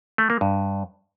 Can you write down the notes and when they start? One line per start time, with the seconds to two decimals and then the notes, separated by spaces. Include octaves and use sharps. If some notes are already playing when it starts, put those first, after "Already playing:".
0.18 A3
0.30 A#3
0.41 G2